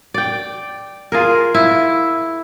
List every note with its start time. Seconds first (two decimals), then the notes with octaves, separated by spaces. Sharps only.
0.14 D5 G5
1.12 F4 G#4 A#4
1.54 E4